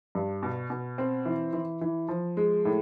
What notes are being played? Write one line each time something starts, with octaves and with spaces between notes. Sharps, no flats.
G2
B2
B2
C4
E3
E3
E3
F3
G#3
A2